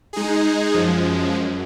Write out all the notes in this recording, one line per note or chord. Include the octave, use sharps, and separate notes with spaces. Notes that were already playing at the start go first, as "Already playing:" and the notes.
G#3 D#4 G#4
F#2 F3 G#3
F#2